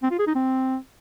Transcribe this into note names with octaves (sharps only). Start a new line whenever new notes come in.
C4
F4
G#4
D#4
C4